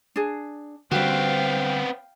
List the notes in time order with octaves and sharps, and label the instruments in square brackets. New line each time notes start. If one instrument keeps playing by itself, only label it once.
[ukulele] D4 G#4
[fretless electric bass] D3 G3 [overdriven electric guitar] B3 C4 [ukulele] F#4 B4 [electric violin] F5 G5